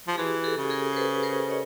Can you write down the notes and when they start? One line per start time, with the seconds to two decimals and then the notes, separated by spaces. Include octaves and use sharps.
0.08 F3
0.13 G4
0.18 E3 F#4 G#4
0.44 G4 A4
0.58 C#3
0.70 G#4 A#4
0.93 C5
0.96 A4 B4
1.14 B4
1.23 A#4 C5
1.49 C#5 D#5